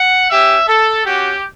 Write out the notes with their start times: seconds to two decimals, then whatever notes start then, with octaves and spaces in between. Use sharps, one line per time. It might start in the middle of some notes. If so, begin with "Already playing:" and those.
Already playing: F#5
0.30 C#4 G4 E5
0.68 A4
1.05 C#4 F#4 G4